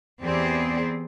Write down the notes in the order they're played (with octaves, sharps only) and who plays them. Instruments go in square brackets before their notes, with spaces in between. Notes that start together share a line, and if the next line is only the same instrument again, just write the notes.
[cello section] E2 B3 C4 G4 G#4 D5